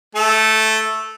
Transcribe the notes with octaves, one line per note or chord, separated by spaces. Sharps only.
A3 A4